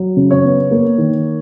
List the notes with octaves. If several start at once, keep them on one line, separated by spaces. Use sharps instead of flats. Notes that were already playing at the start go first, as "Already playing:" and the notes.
Already playing: F#3
C#3
C#5
B3
A#3
D#3